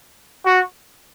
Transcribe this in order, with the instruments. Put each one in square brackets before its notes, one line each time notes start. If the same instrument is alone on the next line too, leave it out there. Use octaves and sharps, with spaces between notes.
[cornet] F#4